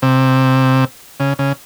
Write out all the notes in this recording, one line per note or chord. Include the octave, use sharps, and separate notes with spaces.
C3
C#3
C#3